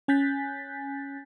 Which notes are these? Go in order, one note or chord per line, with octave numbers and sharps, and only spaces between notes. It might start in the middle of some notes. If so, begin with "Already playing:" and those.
C#4 G#5 F#6 G6 A6 B6